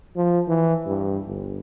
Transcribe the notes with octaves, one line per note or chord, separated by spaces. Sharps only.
F3
E3
G2
G1